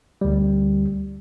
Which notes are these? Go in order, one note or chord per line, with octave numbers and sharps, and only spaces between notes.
D2 G3